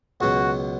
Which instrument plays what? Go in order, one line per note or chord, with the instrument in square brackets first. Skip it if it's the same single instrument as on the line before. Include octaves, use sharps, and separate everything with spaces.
[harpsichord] C#2 B2 F#3 [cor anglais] F#4